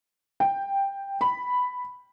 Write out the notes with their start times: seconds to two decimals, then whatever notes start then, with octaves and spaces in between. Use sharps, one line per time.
0.40 G5
1.21 B5